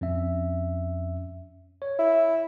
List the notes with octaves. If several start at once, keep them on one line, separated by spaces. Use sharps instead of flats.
F2 C#4 E5
C#5
E4